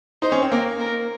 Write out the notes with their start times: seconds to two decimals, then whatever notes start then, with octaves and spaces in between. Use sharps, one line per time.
0.22 D#4 C5
0.32 C#4
0.42 C4
0.51 A#3 A#4
0.80 A#4